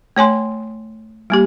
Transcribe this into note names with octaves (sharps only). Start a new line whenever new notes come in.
A3 C#5 G#5 C6
G3 A#3 G4